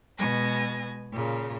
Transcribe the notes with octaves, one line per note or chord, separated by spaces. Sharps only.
B2 G#3 B3 G#5 A#6
A#2 C#3